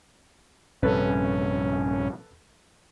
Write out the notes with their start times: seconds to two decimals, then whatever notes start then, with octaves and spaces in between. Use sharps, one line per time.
0.83 A#1 G2 C3 C#4 A4 B4